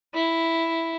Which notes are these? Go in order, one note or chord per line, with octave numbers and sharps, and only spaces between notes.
E4